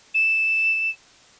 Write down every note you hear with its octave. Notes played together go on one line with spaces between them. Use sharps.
E7